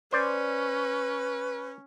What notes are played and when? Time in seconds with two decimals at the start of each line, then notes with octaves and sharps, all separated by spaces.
0.12 C#4 B4 C5 D5